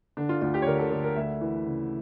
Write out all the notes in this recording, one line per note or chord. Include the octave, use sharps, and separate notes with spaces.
D3 D4
F4
D2 F4
G4
C#5
D3 A#4
A4
D3 A4
A#4
D2 E5
E3
C#3